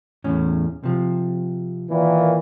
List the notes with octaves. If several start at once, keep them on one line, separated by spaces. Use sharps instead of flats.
E2 A2 C#4
C3 F3
A#2 D#3 E3